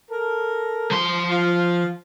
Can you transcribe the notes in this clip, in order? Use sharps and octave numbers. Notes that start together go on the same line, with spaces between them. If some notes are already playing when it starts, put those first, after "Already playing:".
A4 A#4
F3 C6
F4